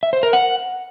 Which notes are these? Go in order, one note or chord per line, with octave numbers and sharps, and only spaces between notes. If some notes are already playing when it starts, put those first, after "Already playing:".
E5
C5
A#4
F#5